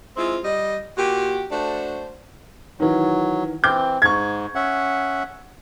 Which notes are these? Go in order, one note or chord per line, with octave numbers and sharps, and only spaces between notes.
G#3 C4 E4 F4
G3 D#5
A#2 F#4 G4
A3 D4 F#4 C5
D#3 E3 F#3
E3 C4 D6 G6
G#2 C#6 G#6
C#4 E5 F#5